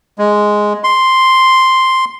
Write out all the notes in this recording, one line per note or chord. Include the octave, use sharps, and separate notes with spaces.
G#3
C6